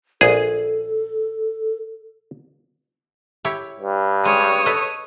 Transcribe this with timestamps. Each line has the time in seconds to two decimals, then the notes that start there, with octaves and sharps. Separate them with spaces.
0.21 A#1 G#4 A4
3.45 E4 G4 C#5
3.80 G2
4.25 G#3 C#5 D#6
4.66 A4 B4 D#5